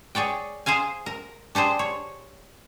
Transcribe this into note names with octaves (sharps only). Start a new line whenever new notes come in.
G#4 C#5 D5 G5
G#4 C5 F5 G#5
A#4
D4 G4 G#4 C5
C#5